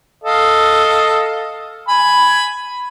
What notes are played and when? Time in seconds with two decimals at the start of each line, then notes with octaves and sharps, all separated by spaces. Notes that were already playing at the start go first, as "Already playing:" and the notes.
0.24 A4 D#5 F5
1.89 G#5 B5